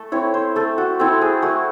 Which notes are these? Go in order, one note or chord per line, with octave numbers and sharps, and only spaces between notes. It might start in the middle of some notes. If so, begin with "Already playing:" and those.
Already playing: A3 A4
C4 E4 C#5
C5
A3 A4
F#4
C4 E4 A4
G#4
A3 F#4